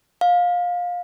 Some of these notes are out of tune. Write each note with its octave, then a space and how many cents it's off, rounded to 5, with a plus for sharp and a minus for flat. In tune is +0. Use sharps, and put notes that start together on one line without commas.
F5 +20